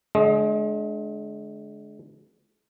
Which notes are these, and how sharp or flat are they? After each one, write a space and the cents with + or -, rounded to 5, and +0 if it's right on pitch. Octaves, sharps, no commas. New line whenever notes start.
D3 +0 G#3 +35 D#5 +0